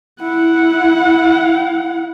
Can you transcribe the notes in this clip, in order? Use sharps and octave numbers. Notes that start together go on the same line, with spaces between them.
E4 F#5